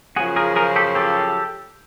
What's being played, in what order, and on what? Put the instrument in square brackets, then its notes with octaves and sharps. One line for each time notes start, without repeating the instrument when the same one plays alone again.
[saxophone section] F#2 C#3 F3 [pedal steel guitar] F#4 G#4
[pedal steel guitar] G#4 A#4
G#4 A#4
G4 A4
G4 A4